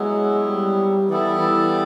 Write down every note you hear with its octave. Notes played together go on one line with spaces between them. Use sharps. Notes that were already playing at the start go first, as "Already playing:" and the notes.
Already playing: F#3 G#3 B3 E4
G3
E3 G3 B3 E4 A4
E3